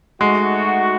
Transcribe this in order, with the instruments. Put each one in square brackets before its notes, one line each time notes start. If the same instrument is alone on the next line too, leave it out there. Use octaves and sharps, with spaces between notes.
[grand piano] G#3 [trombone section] A3 D#4 F#4